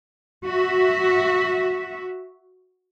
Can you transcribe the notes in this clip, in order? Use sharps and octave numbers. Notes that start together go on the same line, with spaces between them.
F#4 E5